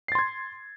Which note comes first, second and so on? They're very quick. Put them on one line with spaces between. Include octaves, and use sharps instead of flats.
C7 A6 C6 G#6